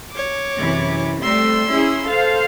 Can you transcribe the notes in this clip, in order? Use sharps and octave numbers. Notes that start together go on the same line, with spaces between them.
C#5 D6
F#2 C3 E3
G3 A3 C4 C6 E6
C#4 E4 G#4
A4 C5 F5